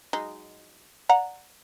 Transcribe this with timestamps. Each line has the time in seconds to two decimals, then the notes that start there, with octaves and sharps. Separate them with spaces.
0.13 F#3 G#3 D#4
1.09 D5 F#5 A#5